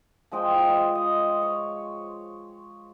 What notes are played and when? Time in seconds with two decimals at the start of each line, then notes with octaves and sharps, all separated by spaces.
0.32 F3 G#3 D#5 G5
0.95 D#5
1.42 C#5